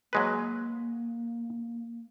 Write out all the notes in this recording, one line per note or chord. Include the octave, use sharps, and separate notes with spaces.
F#3 G#3 A#3 B4